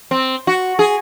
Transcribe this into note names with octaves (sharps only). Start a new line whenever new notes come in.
C4
F#4
G#4